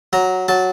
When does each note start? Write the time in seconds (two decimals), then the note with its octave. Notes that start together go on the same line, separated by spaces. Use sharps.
0.13 F#3 A#5
0.48 F#3 A5